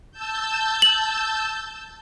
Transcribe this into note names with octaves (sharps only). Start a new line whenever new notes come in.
A5 E6 G6
F#7